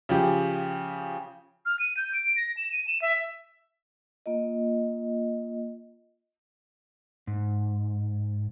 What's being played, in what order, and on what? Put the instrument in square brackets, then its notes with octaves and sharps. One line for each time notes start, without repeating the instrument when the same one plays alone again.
[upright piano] C#3 F3 G4
[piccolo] F6
D#7
G6
D7
A#6
E7
D#7
E7
E5
[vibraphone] A#3 F4 D#5
[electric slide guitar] G#2